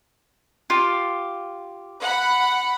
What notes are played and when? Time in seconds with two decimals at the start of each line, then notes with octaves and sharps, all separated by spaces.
0.70 F4 G4
2.00 F#5 B5